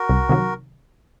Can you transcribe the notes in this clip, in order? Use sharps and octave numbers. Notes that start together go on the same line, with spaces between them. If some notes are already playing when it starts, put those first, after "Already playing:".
Already playing: F#4 A#4
C2
C3 D#3 F#3